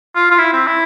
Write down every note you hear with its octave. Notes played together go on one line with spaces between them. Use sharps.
F4
F4
E4
C4
E4